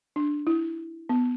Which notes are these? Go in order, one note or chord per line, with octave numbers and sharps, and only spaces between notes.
D4
E4
B3